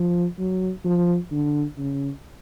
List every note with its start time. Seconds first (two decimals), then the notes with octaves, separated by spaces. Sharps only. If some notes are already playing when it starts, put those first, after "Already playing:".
Already playing: F3
0.39 F#3
0.85 F3
1.31 D3
1.78 C#3